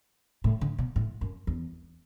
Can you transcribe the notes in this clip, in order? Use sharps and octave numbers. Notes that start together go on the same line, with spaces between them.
A2
D3
B2
A2
F#2
E2